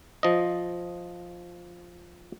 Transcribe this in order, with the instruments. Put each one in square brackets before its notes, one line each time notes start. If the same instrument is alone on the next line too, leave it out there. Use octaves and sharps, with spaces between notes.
[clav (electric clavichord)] F3 D#5